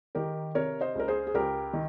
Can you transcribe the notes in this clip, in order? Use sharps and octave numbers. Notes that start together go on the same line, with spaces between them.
D#3 G4 A#4
C3 A#4 C#5
C5 D#5
C#2 A#4
G#4 C5
G#4
C#2 G4 A#4
D#3